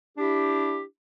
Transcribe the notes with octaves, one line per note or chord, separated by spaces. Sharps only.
D4 E4 G4